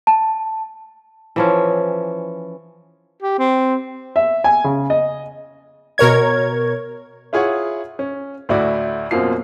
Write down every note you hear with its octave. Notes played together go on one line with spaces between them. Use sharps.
A5
E3 F3 C#4
G4
C4
E5
G#5
C#3
D#5
B2 A#4 C#5 G#6
E4 F4 G#4 C#5 F#5
C#4
D2 A2 E4 F#4 D5
F#2 B2 A#3 C4 F4 C7